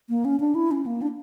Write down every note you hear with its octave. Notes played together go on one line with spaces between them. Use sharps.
A#3
C#4
D4
E4
C#4
A#3
D4